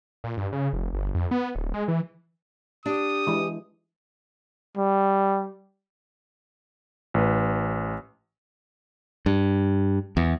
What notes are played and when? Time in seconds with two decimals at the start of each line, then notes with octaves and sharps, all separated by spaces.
0.24 A#2
0.37 G2
0.52 C#3
0.73 F1
0.93 G1
1.15 F2
1.31 B3
1.55 D1
1.74 G#3
1.88 E3
2.86 D4 G4 D#6
3.27 E3 G#3
4.77 G3
7.14 A1 B4
9.26 G2
10.17 E2